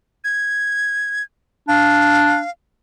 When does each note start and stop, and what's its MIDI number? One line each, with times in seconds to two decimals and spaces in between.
0.24 1.23 92
1.68 2.41 62
1.68 2.50 77